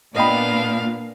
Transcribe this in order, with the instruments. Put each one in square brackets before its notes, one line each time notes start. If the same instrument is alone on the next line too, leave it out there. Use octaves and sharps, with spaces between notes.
[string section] A#2 [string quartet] B3 D4 F5 [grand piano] D#5 G5 B5